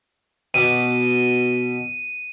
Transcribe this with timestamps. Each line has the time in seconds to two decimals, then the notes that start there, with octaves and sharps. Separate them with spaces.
0.54 B2 D6 D#7